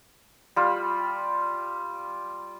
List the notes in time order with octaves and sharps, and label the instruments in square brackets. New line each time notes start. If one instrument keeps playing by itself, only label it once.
[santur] G3 F4 B5